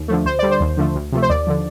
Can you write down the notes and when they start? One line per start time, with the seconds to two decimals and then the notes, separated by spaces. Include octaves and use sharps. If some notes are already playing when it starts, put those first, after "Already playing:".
Already playing: D#2
0.08 D3 F3 A3
0.25 D2 C5
0.39 D3 G3 D5
0.51 C5
0.60 D#2
0.77 D3 F3 A3
0.95 D2
1.12 C3 F3 A3
1.22 C5
1.30 D#2 D5
1.47 D3 F3